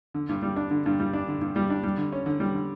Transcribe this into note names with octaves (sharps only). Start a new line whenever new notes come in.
D3
G2
G3
D4
D3
G2
G3
D4
D3
G2
G3
D4
G3
D3
C#4
D3
G3
D3